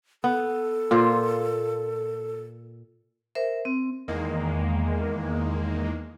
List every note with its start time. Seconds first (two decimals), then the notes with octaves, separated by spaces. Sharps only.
0.24 B3 A4
0.91 A#2 F4 C5
3.35 A#4 C5 E5
3.65 C4
4.08 E2 D#3 G#3 A#3